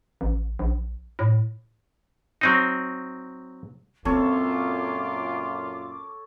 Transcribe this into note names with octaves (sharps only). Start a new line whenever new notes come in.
A1
A#1
A2
F#3 C4 D#4
F#2 A#2 C4 F4 A4 C#5 D6